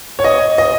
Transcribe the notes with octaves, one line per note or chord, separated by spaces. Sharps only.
C#5
D#5
D#5